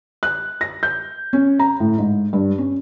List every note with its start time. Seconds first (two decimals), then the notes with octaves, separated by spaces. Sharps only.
0.23 F#6
0.61 A#6
0.83 G6
1.33 C#4
1.59 A#5
1.80 A2
1.98 G#2
2.33 G2
2.58 C#4